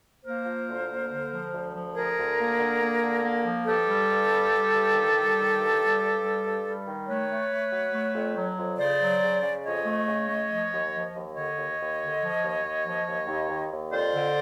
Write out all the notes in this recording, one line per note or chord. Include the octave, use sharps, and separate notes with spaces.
A#3 A#4 C5
F3
D2
A#3
D3
F3
D2
F3
D2 G#4 A#4
D2
A#3
D3
A#3
D3
A#3
F3
G2 G4 A4
G3
G2
G3
G3
G2
D#3
G3
D#3
G2
G3
G2
G3
G2
G3
D#3
A3 B4 C#5
A3
A3
F#3
A3
F2
F#3
F2
C#3 C5 D5
F#3
C#3
C#3
F2 C#5 D#5
A3
C#3
A3
F3
D#2
F3
D#2
D3 C#5 D#5
D#2
D#2
D3
F3
D#2
D#2
F3
D#2
D#2
D#2
D#2
F2 C5 D5
D3